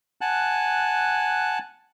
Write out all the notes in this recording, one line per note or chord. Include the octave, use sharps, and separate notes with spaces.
F#5 G#5 A5 F#6